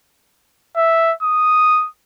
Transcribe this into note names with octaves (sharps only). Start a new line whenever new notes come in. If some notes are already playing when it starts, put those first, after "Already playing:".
E5
D#6